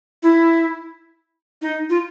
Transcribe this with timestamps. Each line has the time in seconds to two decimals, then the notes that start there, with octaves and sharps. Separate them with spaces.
0.23 E4
1.62 D#4
1.90 F4